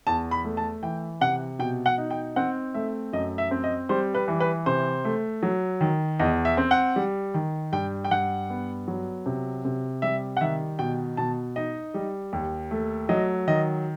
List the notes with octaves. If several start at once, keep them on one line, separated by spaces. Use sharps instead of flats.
E2 A5
B5
A3
A5
E3 G5
C3 F#5
B2 G5
F#5
D#4
G5
C4 F#5
A3 E5
F#2 D#5
E5
C4
D#5
G3 C5
B4
E3
B4
C3 C5
A3
F#3
D#3
E2 D#5
E5
C4
F#5
G3
D#3
G2 G5
G5
G2 F#5
B3
F#3
C3
C3
G3 E5
F#5
D#3 E5
B2 G5
B2 A5
D#4 D#5
G3
D#2
A3
F#3 D#5
D#3 D#5